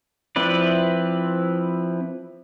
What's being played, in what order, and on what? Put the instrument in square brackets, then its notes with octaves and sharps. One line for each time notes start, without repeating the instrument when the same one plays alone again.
[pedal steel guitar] F3 C4 E4 B4 D5